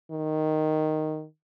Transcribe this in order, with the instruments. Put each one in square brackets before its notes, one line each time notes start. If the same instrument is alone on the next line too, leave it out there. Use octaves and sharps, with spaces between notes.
[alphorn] D#3